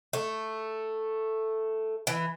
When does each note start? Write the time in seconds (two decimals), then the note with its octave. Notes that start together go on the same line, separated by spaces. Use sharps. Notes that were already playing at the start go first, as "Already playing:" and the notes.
0.13 A3
2.07 E3